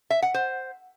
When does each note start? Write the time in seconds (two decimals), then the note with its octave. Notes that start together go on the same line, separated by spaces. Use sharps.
0.10 E5
0.22 F#5
0.34 C5